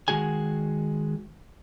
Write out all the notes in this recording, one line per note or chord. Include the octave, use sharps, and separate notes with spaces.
D#3 E3 G#3 F#4 G#4 G#5